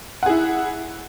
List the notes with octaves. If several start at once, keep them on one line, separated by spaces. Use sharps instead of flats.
E4 G#4 F#5